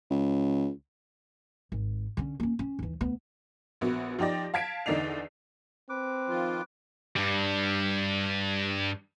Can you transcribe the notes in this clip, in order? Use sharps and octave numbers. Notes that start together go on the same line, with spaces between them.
C#2
G#1
D3 C#4
A#3 C#4
C#4
D#2 E3
D2 B3
A#1 B3 F#4
F3 D#4 G4 D5 A#6
F5 A5 G#6 B6 D7
E2 D3 D#4 D5 C7 F7
C4 B4 D6
D#3 F3 F4
G2 G3